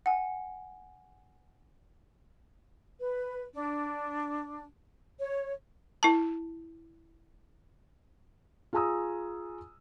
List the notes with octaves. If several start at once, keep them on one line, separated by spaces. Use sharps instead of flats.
F#5 G#5
B4
D4
C#5
E4 A5
F4 G#4 G#5 A#5 D#6 E6